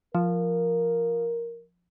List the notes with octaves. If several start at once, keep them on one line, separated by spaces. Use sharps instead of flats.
F3 A#4